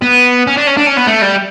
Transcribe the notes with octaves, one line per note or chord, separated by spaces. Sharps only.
B3
C#4
D4
C#4
D4
C#4
B3
A3
G3